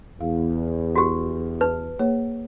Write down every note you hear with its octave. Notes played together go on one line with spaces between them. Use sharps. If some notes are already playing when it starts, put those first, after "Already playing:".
E2 F5
F#4 G4
B4 A5
A#3 G#4 C#5